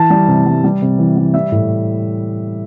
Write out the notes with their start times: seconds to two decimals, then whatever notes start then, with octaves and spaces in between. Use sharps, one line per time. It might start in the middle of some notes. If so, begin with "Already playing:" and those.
Already playing: E3 A5
0.10 G3
0.28 C3
0.46 G3
0.64 G3
0.82 C3
0.98 E3
1.17 G3
1.34 G3 E5
1.52 A2